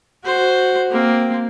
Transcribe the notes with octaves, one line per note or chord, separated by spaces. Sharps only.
F#4 C5
A#3 C4